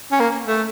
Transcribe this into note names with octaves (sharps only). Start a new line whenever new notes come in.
C#4
A#3
A3